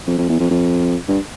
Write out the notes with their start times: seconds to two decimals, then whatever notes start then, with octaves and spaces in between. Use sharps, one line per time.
0.07 F2
0.18 F2
0.29 E2
0.40 F2
0.50 F2
1.08 G2